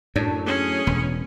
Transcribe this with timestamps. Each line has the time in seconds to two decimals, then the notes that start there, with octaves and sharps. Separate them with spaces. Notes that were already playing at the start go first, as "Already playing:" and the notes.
0.16 F#2 A2 F#3 D4
0.46 C#4 G#4
0.87 E1 B3